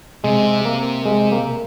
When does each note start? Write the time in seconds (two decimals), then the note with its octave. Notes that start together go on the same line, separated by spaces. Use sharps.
0.24 C3 G#3
0.65 A#3
1.06 G#3
1.32 A#3